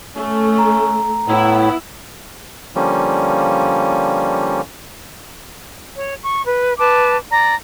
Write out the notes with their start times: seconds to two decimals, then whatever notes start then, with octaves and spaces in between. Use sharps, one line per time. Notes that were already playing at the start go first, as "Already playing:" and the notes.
0.16 A3 C#4
0.58 A#5
1.28 A2 B3 E4
2.75 D3 F3 G3 A#3 C#4
5.95 C#5
6.23 C#6
6.45 B4
6.79 B4 A5 D6
7.30 D5 A#5